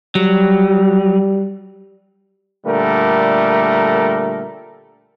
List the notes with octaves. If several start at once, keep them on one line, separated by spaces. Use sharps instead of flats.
F#3 G3
A#2 D3 G3 A3 A#4